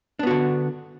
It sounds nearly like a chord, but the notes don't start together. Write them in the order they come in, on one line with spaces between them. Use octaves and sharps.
D4 B3 F#4 D3